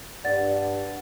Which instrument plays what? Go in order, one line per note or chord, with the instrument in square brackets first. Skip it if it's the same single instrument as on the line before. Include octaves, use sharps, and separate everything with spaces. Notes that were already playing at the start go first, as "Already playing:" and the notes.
[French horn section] G2 [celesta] D5 F#5 A6